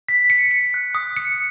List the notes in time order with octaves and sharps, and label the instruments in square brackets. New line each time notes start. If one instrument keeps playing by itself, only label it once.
[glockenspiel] B6
C#7
C#7
F#6
D#6
C#7